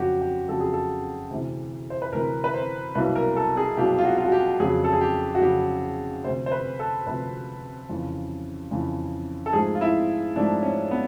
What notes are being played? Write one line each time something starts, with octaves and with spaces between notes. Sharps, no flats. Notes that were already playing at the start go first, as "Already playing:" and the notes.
Already playing: F2 C#3 F#3 F#4 G4
G4
F2 C#3 F#3 A4
G#4
A4
D2 C3 E3
C5
B4
D2 C3 E3 A#4
B4
C5
C2 B2 F#3 A#3 B4
A#4
A4
G#4
C2 B2 F#3 A#3 G4
F4
F#4
F4
F#4
G4
F2 C#3 F#3 G#4
A4
G#4
G4
F#4
F2 C#3 F#3 G4
D2 C3 F3 C5
C5
B4
A4
D2 C3 F3 B4
F2 C#3 E3
F2 C#3 E3
A4
G#2 F3 A3 G#4
F4
E4
G#2 F3 A3 D4
C#4
B3